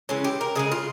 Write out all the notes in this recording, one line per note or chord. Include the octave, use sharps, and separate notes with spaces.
C#3 E3 G#3 C#4
G4
A#4
C#3 E3 G#3 G#4
F4